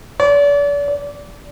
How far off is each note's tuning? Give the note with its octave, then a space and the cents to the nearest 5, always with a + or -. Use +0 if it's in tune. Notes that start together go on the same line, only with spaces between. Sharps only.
D5 -40
D5 -20